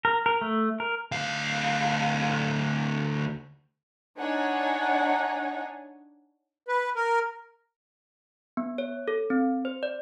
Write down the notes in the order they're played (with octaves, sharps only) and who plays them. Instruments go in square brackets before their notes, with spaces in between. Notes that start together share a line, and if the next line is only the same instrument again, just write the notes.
[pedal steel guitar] A#4
A#4
A3
A#4
[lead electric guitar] D2 F5
[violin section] D4 D#4 C#5 F#5 G#5
[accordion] B4
A#4
[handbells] B3
C#5
A4
C4
C5
D5